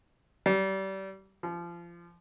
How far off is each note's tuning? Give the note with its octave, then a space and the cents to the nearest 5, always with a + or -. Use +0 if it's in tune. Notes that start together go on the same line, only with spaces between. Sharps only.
G3 -30
F3 -25